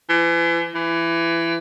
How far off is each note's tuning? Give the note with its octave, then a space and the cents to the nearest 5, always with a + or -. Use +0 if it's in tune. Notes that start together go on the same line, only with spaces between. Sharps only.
E3 +40
E3 +20